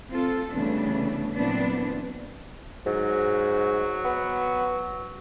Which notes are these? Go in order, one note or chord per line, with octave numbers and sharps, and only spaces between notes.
C4 F4 A4
C#3 E3 G3 A3 B3 D4
A#2 E3 F#3 B3 C4 D4
G#2 F#3
B3